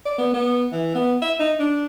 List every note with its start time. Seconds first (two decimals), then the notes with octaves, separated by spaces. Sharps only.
0.06 D5
0.18 B3
0.34 B3
0.72 E3
0.95 B3
1.22 E5
1.39 D#4
1.60 D4